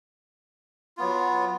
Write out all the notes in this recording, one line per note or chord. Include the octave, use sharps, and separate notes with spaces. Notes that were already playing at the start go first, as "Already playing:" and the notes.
F#3 B3 F4